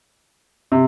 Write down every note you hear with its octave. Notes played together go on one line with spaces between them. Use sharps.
C3